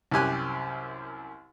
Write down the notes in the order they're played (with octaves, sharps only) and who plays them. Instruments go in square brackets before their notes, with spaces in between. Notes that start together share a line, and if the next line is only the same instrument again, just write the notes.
[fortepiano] C2 F#2 G4 G#5 F#6